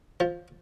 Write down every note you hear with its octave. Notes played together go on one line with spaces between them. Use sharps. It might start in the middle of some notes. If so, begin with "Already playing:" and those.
F3